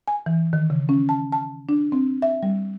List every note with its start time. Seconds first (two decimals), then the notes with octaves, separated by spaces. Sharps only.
0.08 G#5
0.26 E3
0.53 D#3
0.70 C#3
0.89 C#4
1.09 A5
1.32 A5
1.69 D4
1.92 C4
2.22 E5
2.43 G3